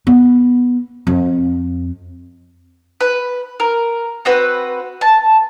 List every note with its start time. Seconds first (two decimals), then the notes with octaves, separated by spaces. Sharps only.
0.07 B3
1.07 F2
3.01 B4
3.60 A#4
4.25 C4 F#4 B4
5.01 A5